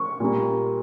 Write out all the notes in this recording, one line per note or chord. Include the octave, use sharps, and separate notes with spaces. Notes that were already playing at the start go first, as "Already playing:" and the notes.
Already playing: C#6
A#2 G3 A#3